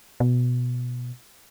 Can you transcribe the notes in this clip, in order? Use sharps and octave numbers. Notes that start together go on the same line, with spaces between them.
B2